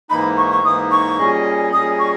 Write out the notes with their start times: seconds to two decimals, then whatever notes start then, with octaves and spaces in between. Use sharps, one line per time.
0.10 G#2 E3 A#3 D#4 B5
0.37 C#6
0.51 C#6
0.64 G#2 E3 A#3 D#4 D#6
0.92 C#6
1.18 A#2 G3 C#4 G#4 D#5
1.73 A#2 G3 C#4 G#4 D#5 D#6
1.99 C#6